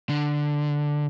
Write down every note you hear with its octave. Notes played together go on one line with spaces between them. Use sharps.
D3